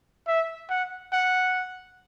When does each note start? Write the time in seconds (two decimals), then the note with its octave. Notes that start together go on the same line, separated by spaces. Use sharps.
0.28 E5
0.70 F#5
1.13 F#5